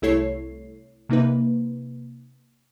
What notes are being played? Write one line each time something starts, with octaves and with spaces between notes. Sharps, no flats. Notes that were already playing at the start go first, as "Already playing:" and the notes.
C2 A3 E4 A4 C#5 C7
C3 A#3 D#4 B4